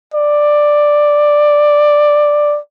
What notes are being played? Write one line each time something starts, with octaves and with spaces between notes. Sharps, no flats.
D5